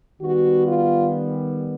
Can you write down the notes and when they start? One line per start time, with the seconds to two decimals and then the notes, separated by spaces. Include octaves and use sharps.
0.20 D#3 G3 B3 F#4
0.66 F4